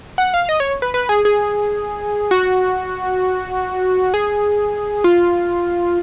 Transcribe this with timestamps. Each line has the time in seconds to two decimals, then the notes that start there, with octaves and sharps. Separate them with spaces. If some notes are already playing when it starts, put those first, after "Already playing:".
0.18 F#5
0.34 F5
0.49 D#5
0.60 C#5
0.82 B4
0.94 B4
1.09 G#4
1.25 G#4
2.31 F#4
4.14 G#4
5.04 F4